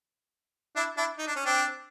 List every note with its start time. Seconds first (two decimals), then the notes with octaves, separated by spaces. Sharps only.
0.76 D4 E4
0.97 D4 E4
1.18 D#4
1.27 D4
1.36 C#4
1.45 C4 D4